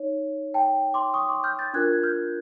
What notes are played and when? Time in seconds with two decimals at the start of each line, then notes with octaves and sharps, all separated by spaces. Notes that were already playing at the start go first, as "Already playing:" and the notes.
Already playing: D#4 C#5
0.54 G5 A5
0.94 C6 D6
1.14 C#6 D#6
1.29 C6 D6
1.44 F6 G6
1.59 G6 A6
1.74 D4 F4 A#4 F#6 G#6
1.93 G#6
2.03 F6 G6